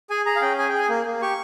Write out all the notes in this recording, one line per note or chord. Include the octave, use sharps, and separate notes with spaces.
G#4 G#5
G#4 A#5
F5
C#4 G5
G#4 G#5
G#4 G5
G#5
A#3
A#3
G4 C#6